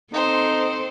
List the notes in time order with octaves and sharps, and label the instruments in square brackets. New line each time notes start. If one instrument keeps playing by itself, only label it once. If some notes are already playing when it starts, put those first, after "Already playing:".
[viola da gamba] C4 A4 [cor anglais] D#4 [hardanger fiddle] C5